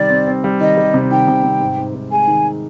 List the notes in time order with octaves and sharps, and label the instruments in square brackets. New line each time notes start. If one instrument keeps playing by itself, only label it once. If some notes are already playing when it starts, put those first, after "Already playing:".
Already playing: [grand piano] C3 D#3 G3 [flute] D5
[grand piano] C4
C4
G3
[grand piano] D#3 [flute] D#5
[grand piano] G3
C3
[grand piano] D#3 [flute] G5
[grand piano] C3
C3
G#2
G#2
G#2
[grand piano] G#3 [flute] G#5
[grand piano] D#3